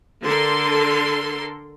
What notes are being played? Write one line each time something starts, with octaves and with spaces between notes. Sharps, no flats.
D3 A4 A#4 C6